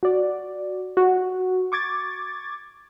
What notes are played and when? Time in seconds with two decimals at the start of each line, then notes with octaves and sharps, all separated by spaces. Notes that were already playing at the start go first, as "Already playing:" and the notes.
0.03 F#4 D5
0.97 F#4
1.72 C#6 D6 G#6 A6